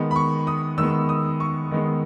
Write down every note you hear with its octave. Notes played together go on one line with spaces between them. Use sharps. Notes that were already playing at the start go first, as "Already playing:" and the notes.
Already playing: D#3 G#3 B3
B5
C#6
D#6
D#3 G#3 B3 E6
D#6
C#6
D#3 G#3 B3